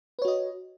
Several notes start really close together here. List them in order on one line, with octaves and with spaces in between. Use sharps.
B4 C#5 F#4 D#5